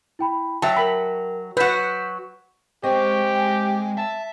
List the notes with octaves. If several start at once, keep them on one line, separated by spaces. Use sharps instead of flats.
E4 G5 B5
F#3 E5 G5 A5
A#4 G5 B5
F#3 F#4 B4 G6 B6 E7
G#3 C4 G4 D#5 C#6
G5 G#5
E5 A5